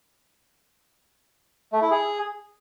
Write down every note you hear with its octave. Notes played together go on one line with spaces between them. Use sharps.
A3
E4
G#4